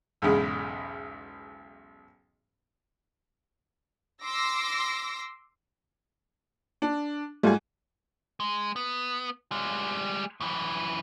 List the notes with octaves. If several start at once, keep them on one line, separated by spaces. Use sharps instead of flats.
B1 E2 G#2 C#3
C6 D6 E6 A#6
D4
G#2 G3 A3 F4 G#4
G#3
B3
G3 G#3
F#2 E3